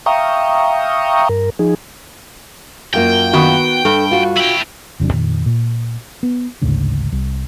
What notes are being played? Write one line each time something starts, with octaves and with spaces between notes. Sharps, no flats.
E5 F5 G5 A#5 C#6 D#6
G2 A#4
F3 D#4 G#4
F#2 A#3 F4 G5
D#3 B3 F#4
G2 A4
F4 F#4
E4 G5
E1 C3 F#3 D4
F2 A#2 D#3
A#2
B3
A1 D2 G#2 C#3
C2